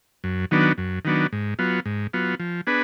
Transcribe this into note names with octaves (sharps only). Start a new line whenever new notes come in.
F#2
D#3 F#3 B3 D4
F#2
D#3 F#3 B3 D4
G#2
F#3 B3 F4
G#2
F#3 B3 F4
F3
B3 D4 G#4 B4